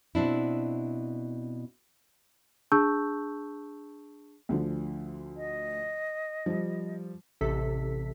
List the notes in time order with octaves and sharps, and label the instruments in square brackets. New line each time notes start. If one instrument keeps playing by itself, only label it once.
[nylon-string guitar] B2 C4 D4 E4
[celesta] D4 G#4 A5 C#6 E6 G6
[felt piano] D2 D3 F3
[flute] D#5
[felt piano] F3 G3
[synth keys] A1 C3 A4 B6